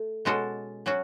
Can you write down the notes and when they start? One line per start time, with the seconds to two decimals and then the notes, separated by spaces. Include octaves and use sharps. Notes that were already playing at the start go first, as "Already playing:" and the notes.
Already playing: A3
0.25 B2 G#3 C#4 F#4 A4
0.86 F#3 C#4 F#4